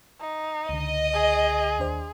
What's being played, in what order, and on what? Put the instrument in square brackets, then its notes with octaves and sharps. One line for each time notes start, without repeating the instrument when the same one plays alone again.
[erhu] D#4
[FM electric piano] C#2 D3 [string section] D#5
[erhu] G#4
[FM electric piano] D#2 D4 C5